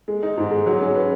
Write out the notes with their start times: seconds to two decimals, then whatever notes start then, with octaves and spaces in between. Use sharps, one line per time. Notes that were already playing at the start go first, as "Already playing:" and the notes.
0.08 G#3
0.23 D#4
0.38 G#2
0.51 G#3
0.66 F#3
0.81 C#4
0.95 B4